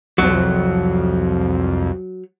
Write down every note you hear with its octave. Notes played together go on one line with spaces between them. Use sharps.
C2 F2 F#3